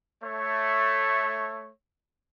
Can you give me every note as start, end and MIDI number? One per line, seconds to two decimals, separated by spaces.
0.22 1.70 57
0.22 1.70 73